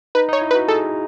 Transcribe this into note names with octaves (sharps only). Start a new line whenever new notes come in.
D#4 B4
D#4 C#5
E4
B4
F#4
G#4 A4